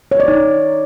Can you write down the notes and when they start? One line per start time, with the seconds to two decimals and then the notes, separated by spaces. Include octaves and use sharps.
0.11 C#5
0.20 D5
0.28 D#4